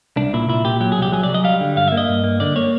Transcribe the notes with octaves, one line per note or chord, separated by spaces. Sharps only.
C2 D4
A#2 E4
A#2 E4
A#2 G4
F#3 G4
G#4
C2 G4
F#3 G#4
D5
F#3
D#5
G3 F5
D3
G2 F5
E5
A#3
D#5
G2
A#3
D3 D5
A#3 C#5